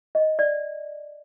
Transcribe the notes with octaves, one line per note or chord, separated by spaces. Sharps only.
D#5
D5